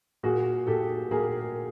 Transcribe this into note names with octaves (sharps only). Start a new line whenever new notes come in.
A#2 F#4 G#4
A#2 G4 A4
A#2 G#4 A#4